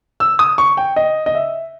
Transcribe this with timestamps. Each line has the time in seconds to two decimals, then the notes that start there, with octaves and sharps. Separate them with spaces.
0.20 E6
0.39 D#6
0.58 C#6
0.77 G5
0.96 D#5
1.26 D#5
1.35 E5